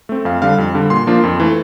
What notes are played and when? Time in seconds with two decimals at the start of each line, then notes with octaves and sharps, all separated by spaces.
0.09 A3 C4
0.25 F2 F5
0.42 D3 G3 F5
0.58 F2
0.74 D3 G3
0.90 A#2 C6
1.07 F3 A#3 D4 F4
1.23 F2
1.40 E3 A3